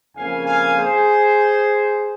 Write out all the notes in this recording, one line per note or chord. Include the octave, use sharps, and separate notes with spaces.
F2 C#3 F3 A#3 F5 G#5
F5 G#5
G#4 C5